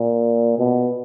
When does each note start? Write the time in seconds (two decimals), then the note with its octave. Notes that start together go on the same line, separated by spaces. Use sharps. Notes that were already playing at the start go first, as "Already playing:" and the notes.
Already playing: A#2
0.59 B2